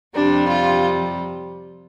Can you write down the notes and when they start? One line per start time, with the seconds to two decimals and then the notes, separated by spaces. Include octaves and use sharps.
0.15 F2 C3 G3 D4
0.48 F4